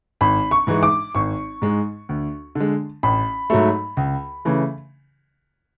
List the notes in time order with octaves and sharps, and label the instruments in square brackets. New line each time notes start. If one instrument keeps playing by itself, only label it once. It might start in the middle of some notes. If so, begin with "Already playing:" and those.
[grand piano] G#1 B5
C#6
G#2 E3 G#3
D6
G#1 C#6
G#2 G#3
D2
D3 G#3
A1 B5
G#2 F#3 A3
C#2
C#3 E3 A3